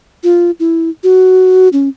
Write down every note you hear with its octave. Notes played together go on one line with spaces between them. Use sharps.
F4
E4
F#4
C#4